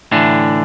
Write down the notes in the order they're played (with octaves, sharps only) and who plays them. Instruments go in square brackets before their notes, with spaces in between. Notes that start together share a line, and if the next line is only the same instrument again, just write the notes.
[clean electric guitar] A2 D3 E3 D4